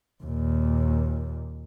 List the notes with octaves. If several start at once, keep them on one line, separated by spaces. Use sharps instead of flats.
D#2 A#2